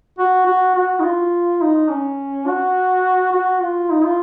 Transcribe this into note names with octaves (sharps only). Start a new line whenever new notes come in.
F#4
F#4
F#4
D#4
F4
D#4
C#4
F#4
F#4
F4
D#4
F4